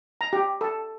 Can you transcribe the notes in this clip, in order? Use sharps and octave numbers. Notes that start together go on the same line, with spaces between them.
A#5
G4
A4